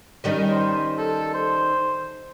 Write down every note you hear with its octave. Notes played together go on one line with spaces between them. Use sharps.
D#3 G3 C#4
C5
A4
C5